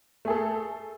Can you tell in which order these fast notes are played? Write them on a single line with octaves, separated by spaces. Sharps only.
A3 G#4 A4